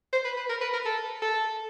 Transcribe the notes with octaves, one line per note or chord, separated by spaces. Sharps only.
C5
B4
B4
A#4
B4
A#4
A4
A4